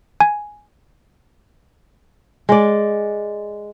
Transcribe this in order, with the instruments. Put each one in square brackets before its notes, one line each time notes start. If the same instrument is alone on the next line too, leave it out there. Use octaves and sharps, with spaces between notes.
[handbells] G#5
[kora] G#3 D5